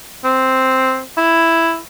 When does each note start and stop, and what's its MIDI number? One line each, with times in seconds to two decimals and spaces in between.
0.24 0.99 60
1.17 1.76 64